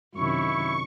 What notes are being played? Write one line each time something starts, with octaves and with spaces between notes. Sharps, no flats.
F#2 C3 D#3 E4 C#6